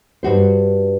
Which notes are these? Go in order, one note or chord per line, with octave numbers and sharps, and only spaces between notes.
G2 G3 F#4 C5